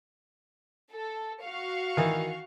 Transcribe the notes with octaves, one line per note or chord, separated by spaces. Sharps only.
A4
F#4 F5 C#6
D#3 E3